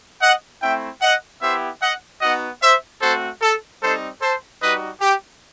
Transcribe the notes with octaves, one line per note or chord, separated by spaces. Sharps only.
D#5 F#5
A3 C4 E4 E5 G5
D#5 F#5
B3 E4 G4 C5 E5
D#5 F#5
B3 D#4 F#4 D#5 F#5
C5 E5
A3 C4 F#4 A4 C5
A4
G3 C4 D#4 A4 C5
A4 C5
G3 D#4 F#4 B4 D#5
G4